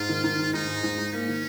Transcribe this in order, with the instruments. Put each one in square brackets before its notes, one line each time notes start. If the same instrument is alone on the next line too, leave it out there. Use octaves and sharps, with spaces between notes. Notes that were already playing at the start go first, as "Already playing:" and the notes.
Already playing: [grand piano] G#2 [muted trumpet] F4
[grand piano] D#3
D#3
G#2
[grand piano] G#2 [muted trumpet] D#4
[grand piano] G#3
G#2
G#2
[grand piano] A#3 [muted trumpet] C#4
[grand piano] D#3